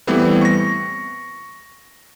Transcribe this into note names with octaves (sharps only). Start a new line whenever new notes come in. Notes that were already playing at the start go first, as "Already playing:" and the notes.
E3 G3 A3 B3 C4
C#6 A#6